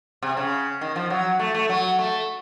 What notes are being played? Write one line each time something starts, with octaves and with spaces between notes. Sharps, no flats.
C3
C#3
D#3
F3
F#3
A3
A3
F#3
A3